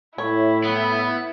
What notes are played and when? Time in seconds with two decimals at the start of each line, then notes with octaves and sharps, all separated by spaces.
0.18 A2 E4 C#5
0.64 B3